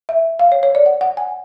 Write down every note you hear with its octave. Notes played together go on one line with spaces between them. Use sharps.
E5
F5
C#5
C#5
D5
F#5
F#5
G#5